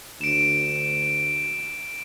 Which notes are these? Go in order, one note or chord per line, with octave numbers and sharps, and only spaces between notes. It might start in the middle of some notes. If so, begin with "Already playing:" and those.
D2 D7 E7